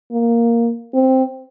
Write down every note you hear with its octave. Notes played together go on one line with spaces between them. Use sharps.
A#3
C4